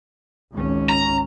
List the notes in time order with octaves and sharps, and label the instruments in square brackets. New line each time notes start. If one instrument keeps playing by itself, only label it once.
[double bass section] G#1 C#2 C#4
[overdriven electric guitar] A#5